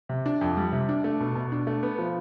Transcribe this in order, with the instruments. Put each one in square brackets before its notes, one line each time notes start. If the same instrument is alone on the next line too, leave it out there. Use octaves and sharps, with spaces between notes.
[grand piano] C3
D4
F2
G3
C3
D4
A3
B2
B2
D4
A3
B3
F3